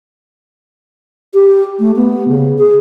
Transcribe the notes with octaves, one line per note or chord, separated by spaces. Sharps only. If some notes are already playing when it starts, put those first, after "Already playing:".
G4
A3
B3
C#3
G#4